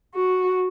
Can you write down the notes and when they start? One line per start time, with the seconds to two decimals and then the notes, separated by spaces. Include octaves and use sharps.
0.15 F#4